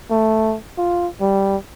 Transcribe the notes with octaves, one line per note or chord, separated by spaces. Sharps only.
A3
F4
G3